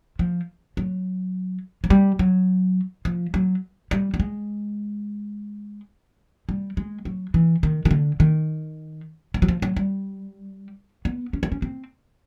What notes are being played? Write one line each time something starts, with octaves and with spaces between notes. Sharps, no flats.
F3
F#3
F#3
G3
F#3
F3
F#3
G3
G3
G#3
G3
G#3
F#3
E3
D#3
D#3
D3
D#3
E3
F#3
F3
F#3
G3
B3
C#4
C4
C#4
C4